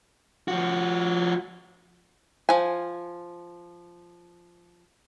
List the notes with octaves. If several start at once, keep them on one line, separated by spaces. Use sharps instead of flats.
F3 F#4
F3 G#5